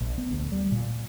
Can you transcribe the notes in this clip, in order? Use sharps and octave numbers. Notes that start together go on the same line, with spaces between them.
A#1
B3
D2
G3
A#2